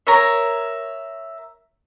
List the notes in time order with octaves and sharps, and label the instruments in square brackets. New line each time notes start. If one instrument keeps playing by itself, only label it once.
[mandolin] A#4 C#5 E5